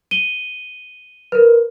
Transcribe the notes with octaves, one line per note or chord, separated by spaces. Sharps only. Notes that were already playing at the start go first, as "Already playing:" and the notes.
D#7 G7
A#4 B4